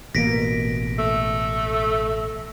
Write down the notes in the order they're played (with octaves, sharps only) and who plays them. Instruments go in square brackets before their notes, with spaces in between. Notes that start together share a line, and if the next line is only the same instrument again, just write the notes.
[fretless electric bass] A1 B2 A#3 [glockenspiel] A#6 B6 D7
[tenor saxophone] A3